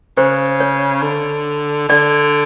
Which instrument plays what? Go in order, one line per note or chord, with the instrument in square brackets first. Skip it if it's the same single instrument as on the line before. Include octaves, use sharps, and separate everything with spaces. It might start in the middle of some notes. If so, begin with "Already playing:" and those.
[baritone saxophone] C#3 [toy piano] C5
[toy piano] C#5
[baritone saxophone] D3
[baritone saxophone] D3 [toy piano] D5